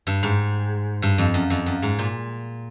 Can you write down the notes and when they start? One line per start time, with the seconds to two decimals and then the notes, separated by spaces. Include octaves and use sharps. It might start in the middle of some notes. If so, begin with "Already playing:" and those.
0.07 G2
0.23 G#2
1.02 G2
1.18 F2
1.34 F#2
1.50 F2
1.66 F#2
1.82 G#2
1.99 A#2